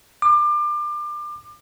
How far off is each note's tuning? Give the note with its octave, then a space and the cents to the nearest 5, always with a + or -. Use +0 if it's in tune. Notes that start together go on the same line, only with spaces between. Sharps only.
D6 +30